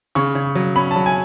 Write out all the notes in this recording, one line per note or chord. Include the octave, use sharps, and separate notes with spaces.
C#3 C#6
C#3
F#3
C#4 B5
A5
F#3
G#5